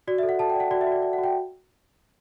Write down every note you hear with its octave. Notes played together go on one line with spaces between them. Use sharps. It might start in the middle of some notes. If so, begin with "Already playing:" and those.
F#4 D5
E5
A4
F#5
A4 A5
G5
D5 F#5
F#4 D5
E5
F#4
D5
D5
F#5
F#4
G5